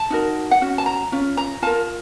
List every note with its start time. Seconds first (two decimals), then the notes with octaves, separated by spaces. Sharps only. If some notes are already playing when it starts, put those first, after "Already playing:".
Already playing: A5
0.10 D#4 F#4 A#4
0.51 F#5
0.61 C#4 F#4
0.78 A5
0.86 A#5
1.12 C#4 F4
1.37 A#5
1.62 F4 A#4 A5